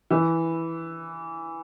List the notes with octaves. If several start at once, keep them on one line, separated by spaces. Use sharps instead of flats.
E3